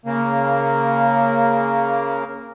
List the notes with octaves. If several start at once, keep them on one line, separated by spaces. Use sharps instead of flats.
C#3 A#3